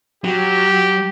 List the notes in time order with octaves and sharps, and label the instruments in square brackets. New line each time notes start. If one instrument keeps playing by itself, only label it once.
[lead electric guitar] F#3 [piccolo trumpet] G4